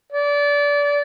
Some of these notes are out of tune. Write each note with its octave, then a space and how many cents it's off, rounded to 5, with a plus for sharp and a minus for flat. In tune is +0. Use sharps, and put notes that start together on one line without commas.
D5 -25